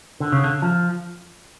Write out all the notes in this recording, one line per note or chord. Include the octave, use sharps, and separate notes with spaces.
D3
C#3
D3
F3